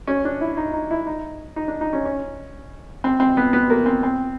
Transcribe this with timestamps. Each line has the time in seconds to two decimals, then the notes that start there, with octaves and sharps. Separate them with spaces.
0.07 C#4
0.25 D4
0.41 E4
0.57 D#4
0.73 D#4
0.91 E4
1.07 D#4
1.56 D#4
1.68 D4
1.81 D#4
1.93 C#4
2.05 C#4
3.04 C4
3.20 C4
3.37 B3
3.53 B3
3.70 A#3
3.86 C4
4.03 C4